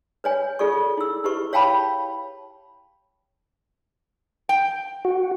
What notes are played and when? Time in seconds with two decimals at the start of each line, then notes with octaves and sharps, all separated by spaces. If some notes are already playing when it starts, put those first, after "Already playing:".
0.24 B4 C#5 G#5
0.59 F4 G#4 A4 D5 C#6
0.97 E4 E6
1.24 E4 G4 B4 C#6
1.53 C#5 F5 G5 A5 B5 C#6
4.49 G5
5.05 F#4